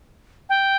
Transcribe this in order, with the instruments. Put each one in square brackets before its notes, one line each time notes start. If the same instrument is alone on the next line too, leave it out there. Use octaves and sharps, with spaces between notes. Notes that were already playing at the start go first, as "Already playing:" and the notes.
[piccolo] G5